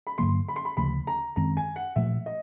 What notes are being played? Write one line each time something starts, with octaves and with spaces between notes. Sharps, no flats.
B5
G2 D3 F#3 A#3 C6
B5
C6
B5
D2 C#3 F3 A3 B5
A#5
F#2 D#3 G#3 C4 A#5
G#5
F#5
A#2 F3 A3 E5
D#5